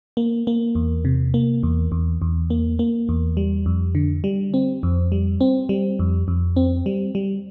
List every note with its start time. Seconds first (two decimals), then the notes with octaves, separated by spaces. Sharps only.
0.17 A#3
0.47 A#3
0.75 E2
1.05 C3
1.34 A#3
1.63 E2
1.92 E2
2.22 E2
2.50 A#3
2.79 A#3
3.09 E2
3.37 G3
3.66 F2
3.95 D3
4.24 G3
4.54 C4
4.83 F2
5.12 G3
5.41 C4
5.69 G3
5.99 F2
6.28 F2
6.56 C4
6.86 G3
7.15 G3